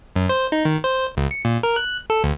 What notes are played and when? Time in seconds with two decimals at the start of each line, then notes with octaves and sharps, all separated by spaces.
0.16 F#2
0.29 C5
0.52 D#4
0.65 D#3
0.84 C5
1.17 C#2
1.31 C#7
1.45 A#2
1.63 A#4
1.76 F#6
2.10 A4
2.24 D2